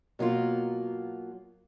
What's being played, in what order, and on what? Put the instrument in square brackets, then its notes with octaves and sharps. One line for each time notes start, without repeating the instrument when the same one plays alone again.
[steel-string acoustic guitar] B2 F#3 A#3 F4